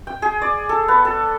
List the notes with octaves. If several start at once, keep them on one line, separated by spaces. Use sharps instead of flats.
G5
G#4
D5
A4
B3
A4